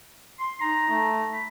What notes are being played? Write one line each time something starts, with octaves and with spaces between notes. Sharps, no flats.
C6
D#4 A#5
A3
B5